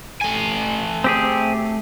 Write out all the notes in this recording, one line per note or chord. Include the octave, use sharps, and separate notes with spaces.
A3 G#5
C4 G4 G#4